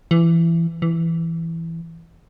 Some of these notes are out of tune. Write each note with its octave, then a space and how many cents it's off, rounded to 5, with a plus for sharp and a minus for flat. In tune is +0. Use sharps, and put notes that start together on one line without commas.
E3 +20
E3 +5